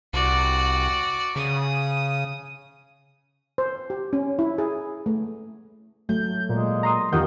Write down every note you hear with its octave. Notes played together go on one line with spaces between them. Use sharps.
C2 F#4 D5
C#3 D#6
C5
G4
C#4
E4
G#4
A3
F#3 A3 G6
A#2 G#3
A#5 C6 D#6
E2 D#3 F4 G4 D#5 F#5 G6